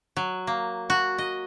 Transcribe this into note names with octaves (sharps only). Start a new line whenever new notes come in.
F#3
A#3
F#4
D#5